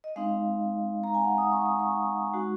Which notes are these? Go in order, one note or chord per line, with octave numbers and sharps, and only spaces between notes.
D#5
G#3 C4 D#4 F5
A#5
G#5
F#5
D#6
C#6
D#6
C#6
G#3 D#4 F#4